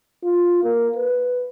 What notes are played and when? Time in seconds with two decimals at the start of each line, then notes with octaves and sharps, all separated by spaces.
0.23 F4
0.63 A#3
0.96 B4